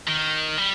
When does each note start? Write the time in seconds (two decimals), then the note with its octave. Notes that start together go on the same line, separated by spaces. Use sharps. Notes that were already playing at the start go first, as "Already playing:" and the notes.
0.08 D#3
0.58 G3